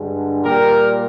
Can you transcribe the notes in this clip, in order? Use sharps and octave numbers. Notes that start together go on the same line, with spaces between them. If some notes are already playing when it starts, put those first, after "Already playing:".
Already playing: G2 D3 G#3
A#2 G3 G4 A#4